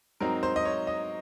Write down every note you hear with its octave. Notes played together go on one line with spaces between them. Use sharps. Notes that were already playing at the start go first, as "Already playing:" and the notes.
G#2 F#3 C4 D#4 A#4
C5
D#5
C#5
D#5